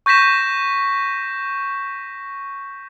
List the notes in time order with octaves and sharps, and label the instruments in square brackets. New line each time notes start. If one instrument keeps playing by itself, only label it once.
[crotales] C#6 G6 A#6 B6 E7